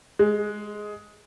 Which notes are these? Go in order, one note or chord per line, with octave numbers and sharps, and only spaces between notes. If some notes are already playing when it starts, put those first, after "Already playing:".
G#3